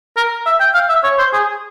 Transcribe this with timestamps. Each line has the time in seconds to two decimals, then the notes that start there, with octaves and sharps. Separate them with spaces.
0.17 A#4
0.46 E5
0.60 G5
0.74 F5
0.89 E5
1.04 C#5
1.18 C5
1.33 G#4